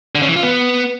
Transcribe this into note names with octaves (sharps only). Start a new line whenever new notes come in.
D3
C#3
E3
F4
B3